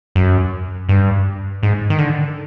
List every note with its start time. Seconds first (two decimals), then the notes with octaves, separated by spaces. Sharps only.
0.15 F#2
0.89 G2
1.63 G#2
1.90 D#3
1.98 D3